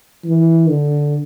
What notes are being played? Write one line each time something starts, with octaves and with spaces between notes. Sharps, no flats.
E3
D3